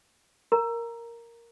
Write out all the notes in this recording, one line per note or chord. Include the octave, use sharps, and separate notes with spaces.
A#4 A#5